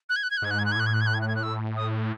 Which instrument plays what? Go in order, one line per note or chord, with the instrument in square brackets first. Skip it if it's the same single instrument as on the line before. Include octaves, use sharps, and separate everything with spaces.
[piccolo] F#6
G#6
F#6
G#6
F#6
[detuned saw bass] G#2 [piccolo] G#6
[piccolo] F#6
G#6
F#6
G#6
[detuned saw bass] A2 [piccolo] F#6
[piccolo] G#6
F#6
G#6
F#6
G#6
F#6
G#6
F#6
E6
D#6